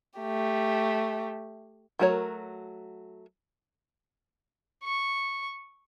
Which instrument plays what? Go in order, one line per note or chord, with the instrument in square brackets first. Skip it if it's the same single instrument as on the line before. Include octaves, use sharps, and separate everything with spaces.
[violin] A3 G4
[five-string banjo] F#3 A3 F#4 A#4 C#5
[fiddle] C#6